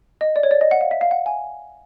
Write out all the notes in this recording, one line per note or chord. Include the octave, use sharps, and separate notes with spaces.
D#5
D5
C#5
D5
D#5
F#5
F5
E5
F5
F#5
G#5